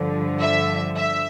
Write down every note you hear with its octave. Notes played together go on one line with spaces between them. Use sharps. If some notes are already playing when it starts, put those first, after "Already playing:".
Already playing: G2 D3 F3
E5
E5